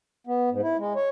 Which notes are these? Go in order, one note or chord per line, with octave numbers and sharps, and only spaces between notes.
B3
G#2
E4
G#3
C#5